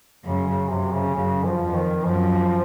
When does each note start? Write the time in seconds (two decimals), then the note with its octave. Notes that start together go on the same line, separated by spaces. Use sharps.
0.25 F#2 C#3
0.47 C#3
0.70 F#2 C3
0.92 C#3
1.14 F#2 C#3
1.45 F3
1.60 F2
1.74 D#3
2.04 F#2 F3